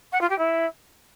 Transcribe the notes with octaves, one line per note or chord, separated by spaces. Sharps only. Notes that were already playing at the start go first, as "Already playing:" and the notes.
F#5
F4
G4
E4